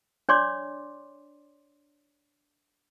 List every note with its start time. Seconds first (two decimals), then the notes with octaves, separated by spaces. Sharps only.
0.29 D4 C#5 D5 C6 D6